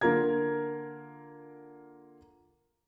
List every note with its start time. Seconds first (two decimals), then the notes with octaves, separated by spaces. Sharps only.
0.01 D3 A#3 F4 A#4 A#5 G#6